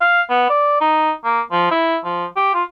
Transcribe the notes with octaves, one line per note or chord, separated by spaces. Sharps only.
F5
B3
D5
D#4
A#3
F3
E4
F3
G4
F4